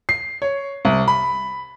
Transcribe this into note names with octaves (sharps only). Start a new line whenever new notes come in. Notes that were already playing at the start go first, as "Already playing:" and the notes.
C7
C#5
C2
B5